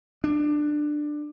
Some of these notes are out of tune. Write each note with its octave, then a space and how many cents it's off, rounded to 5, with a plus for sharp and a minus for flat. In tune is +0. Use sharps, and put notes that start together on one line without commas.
D4 +15